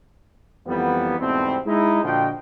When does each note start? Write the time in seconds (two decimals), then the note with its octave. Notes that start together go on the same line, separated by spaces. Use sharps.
0.67 F2 E3 G3 A#3 B3
1.19 E2 G#2 B2 G3 A3 C4
1.67 G#3 D#4 E4
2.04 A#2 D3 F3 F#4 D#5 G5